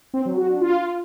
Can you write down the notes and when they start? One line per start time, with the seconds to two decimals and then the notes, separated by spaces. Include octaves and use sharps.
0.14 C4
0.25 F#3
0.37 F#4
0.49 D4
0.61 F4